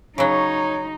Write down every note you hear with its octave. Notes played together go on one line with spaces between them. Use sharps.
C#3 F#3 D#4 C#5